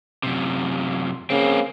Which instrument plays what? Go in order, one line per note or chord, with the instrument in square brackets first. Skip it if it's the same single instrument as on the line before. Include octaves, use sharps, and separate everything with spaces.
[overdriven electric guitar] F#2 C3
[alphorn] C#3 [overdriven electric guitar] A#3 C4